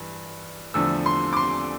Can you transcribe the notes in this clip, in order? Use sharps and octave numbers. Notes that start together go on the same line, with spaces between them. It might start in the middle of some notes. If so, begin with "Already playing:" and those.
Already playing: G2 E3
E2 D3 F3 A3 E6
C6
D6
C6